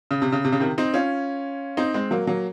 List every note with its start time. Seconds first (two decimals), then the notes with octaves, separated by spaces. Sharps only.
0.11 C#3
0.22 C3
0.32 C#3
0.45 C3
0.52 C#3
0.60 C3 D#3
0.78 C4 D#4
0.94 C#4 F4
1.77 C4 D#4
1.94 G#3 C4
2.11 F#3 A#3
2.27 F#3 A#3